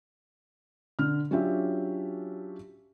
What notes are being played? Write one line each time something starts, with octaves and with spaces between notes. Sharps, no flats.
D3 F6
F#3 C#4 D4 F4 G4 E5